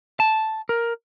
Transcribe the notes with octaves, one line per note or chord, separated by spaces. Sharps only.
A5
A#4